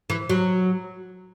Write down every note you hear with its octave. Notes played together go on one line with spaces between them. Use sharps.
E3
F#3